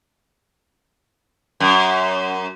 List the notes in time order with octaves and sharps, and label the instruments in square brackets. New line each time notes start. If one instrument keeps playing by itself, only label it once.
[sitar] F#2